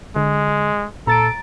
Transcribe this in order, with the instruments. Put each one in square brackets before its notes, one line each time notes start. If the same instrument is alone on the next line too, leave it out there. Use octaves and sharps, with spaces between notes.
[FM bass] D3 [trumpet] G#3
[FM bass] A#2 [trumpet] A4 [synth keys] A#5 A6 D7